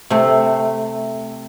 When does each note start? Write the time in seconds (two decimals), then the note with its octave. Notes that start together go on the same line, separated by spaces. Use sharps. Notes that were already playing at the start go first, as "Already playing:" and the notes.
0.10 C3 A3